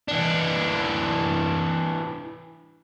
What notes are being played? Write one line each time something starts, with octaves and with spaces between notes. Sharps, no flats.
E3 D4